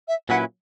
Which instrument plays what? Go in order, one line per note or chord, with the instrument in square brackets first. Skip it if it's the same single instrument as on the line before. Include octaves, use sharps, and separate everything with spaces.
[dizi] E5
[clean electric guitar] A#2 F#3 C#4 E4 B4 [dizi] F#5